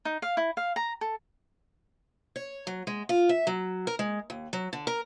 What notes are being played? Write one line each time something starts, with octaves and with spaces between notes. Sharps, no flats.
D#4
F5
E4
F5
A#5
A4
C#5
F#3
G#3
F4
E5
F#3
A#4
G#3
D#2
F#3
D3
A#4